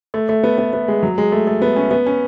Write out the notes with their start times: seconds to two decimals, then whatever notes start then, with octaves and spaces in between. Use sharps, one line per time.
0.14 A3
0.29 A3
0.43 B3
0.58 B3
0.73 B3
0.88 G#3
1.03 F#3
1.18 G#3
1.32 A3
1.47 A3
1.62 B3
1.76 C#4
1.91 B3
2.06 C#4